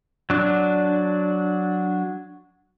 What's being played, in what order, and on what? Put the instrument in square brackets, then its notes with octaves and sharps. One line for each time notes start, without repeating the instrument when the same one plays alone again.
[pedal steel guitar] F#3 D4